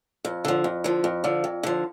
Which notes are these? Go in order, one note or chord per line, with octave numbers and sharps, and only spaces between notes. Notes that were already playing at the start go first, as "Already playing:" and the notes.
F2
D3 F3
F2
D3 F3
F2
D3 F3
F2
D3 F3